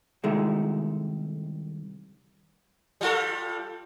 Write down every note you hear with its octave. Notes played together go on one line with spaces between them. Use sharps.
C2 D#3 G#3 A3
G3 F4 A4